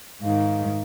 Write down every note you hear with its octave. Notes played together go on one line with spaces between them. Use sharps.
G#2 D#3 F5